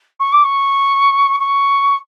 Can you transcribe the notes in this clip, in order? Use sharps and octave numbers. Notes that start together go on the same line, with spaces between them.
C#6
D6
C#6
C#6